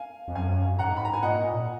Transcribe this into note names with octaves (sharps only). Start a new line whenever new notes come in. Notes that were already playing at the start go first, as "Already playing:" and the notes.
Already playing: F5 G#5
F2
F#2 F5 G#5
G#2 F#5 A#5
B5
A#5
G#5
A#2 D#5 F#5